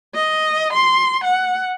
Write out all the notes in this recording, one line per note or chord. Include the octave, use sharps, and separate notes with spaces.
D#5
C6
F#5